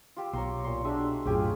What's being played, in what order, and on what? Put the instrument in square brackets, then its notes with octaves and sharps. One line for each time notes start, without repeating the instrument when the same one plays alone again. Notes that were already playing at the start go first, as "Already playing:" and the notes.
[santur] F4 G4 E6
[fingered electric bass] B1 [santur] C#5 A#5 C6
[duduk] A#2 [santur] C6
[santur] G#3 F#4 E5 [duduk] D4
[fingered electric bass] B1 F#2 A2 [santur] C#4 G4 G#5 [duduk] F4 [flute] G#4